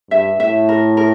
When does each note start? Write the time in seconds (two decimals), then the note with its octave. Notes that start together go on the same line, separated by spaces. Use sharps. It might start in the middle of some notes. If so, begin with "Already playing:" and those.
0.11 G2 E5
0.39 A2 E5
0.69 A#4
0.97 A#4